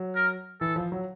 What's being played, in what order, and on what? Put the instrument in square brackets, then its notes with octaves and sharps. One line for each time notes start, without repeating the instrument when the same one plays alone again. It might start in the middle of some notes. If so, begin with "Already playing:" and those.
Already playing: [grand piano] F#3
[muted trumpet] A#4
[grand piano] E3 [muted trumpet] A4
[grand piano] F3
F#3